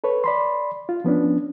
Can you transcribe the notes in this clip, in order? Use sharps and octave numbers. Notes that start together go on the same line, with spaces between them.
A4 B4 C#5
D5 B5 C6
F4
F3 B3 C#4 D4